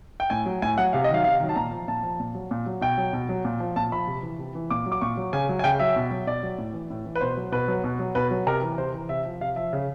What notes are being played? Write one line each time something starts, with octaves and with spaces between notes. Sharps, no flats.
G5
A2 G#5
F#3
A2 G#5
F#3 F#5
C3 F5
D#5
D#3 F#3 F5
C3 F5
D#3 F#3
A5
A#2 A#5
F3
A#2 A5
F3
A#2
F#3
A#2
F#3
B2 G5
F#3
B2
F#3
A#2
F3
A#2 A5
F3 B5
C3
E3
C3
E3
A#2 D6
F#3
D6
A#2 C#6
F#3
C#3 G#5
F#3
G#5
C#3 G5
F#3 E5
B2
F#3
B2 D5
F#3
A2
E3
A2
E3
B4
B2 C5
F#3
B2 B4
F#3
B2
F#3
B2 B4
F#3
C3 A#4
E3
C3 C5
E3
C3 E5
F3
C3 F5
F3 E5
C#3